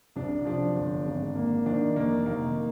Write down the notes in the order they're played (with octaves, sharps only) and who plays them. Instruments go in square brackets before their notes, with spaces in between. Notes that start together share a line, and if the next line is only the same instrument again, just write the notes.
[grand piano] C2 [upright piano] D4
[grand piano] F3 [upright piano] D4
[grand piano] G1
G#1
A#3
[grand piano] D#3 [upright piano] D4
[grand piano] F1 [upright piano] A#3
[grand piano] D#3 [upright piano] A#3